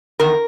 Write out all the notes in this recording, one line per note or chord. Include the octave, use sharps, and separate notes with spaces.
E2 D#3 A#4